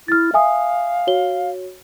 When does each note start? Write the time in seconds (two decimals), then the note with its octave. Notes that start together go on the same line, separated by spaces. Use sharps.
0.08 E4 F6 A6
0.34 E5 F5 G#5 D#6
1.07 F#4 C#5 G7